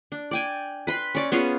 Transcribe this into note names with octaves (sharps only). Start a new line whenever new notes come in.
D4
D5 G5 G#5
B4 B5 C6
C#4 D5
B3 C#4 F4 G#4